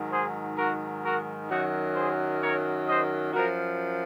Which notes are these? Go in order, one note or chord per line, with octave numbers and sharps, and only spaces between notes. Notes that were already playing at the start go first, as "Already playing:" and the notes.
Already playing: G#2 D#3 F#3
G#4 C5
F#4 A#4
F#4 A#4
F#2 D#3 F#3 D#4 F#4
G#4 C5
A#4 C#5
C5 D#5
F#2 F3 F#4 A#4